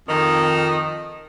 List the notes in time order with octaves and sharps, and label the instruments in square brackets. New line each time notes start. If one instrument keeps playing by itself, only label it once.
[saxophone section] F2 D#3